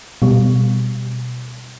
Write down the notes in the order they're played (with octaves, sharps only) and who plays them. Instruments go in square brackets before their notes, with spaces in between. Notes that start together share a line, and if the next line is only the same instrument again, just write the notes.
[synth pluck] B2 G3